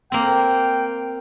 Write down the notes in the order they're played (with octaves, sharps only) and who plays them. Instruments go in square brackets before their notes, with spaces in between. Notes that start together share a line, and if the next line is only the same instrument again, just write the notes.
[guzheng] A#3 C4 [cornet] G5